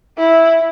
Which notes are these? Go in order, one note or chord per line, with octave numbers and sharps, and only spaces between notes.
E4